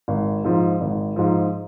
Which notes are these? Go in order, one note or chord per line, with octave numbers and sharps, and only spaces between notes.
G#1
G#2 F3
G#1
G#2 F3